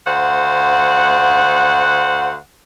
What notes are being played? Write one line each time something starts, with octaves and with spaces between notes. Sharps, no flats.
D2 C5 F5 F#5